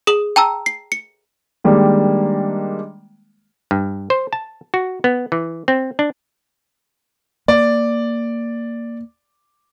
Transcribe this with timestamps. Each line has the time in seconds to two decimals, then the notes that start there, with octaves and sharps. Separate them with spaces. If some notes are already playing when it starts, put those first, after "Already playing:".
0.07 G#4 D#6 F#7
0.36 G5 A5 A#5 E6
0.66 C7
0.92 C#7
1.64 D#3 G3 G#3 A#3 D4
3.71 G2
4.10 C5
4.33 A5
4.74 F#4
5.04 B3
5.32 E3
5.68 C4
5.99 D4
7.48 A#3 D5